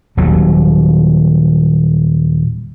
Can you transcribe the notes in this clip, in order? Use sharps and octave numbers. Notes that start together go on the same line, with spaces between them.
D#1 D#2 F#3